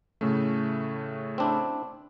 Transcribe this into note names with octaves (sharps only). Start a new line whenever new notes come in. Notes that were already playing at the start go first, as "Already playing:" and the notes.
A2 C#3 A3
C4 D4 E4